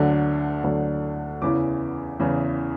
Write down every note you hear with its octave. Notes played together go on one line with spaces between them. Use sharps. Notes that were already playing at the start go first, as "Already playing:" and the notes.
Already playing: D2 D3 F#3
D2 D3 F#3
E2 C#3 E3 D6
E2 C#3 E3